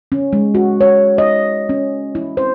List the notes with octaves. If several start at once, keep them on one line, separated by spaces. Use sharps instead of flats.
C#4
G#3
F#4
C#5
D#5
C#4
E4
C5